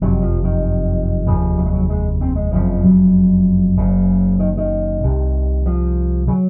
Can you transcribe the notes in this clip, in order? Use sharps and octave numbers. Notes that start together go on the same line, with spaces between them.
F#1 F2 C3 F#3
F3
D#3
F1 D#2 C#3 F3
F#3
G#3
F#3
G#3
C4
G#3
F#1 F2 C#3 F3
F#3
F#1 F#2 C#3
D#3
D#3
C2 C3
F3
C#3 F#3